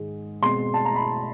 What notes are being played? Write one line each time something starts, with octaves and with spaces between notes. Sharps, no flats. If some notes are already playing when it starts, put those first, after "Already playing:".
Already playing: G#2 D#3 G#3
B2 G#3 C4 C6
A5
A#5
B5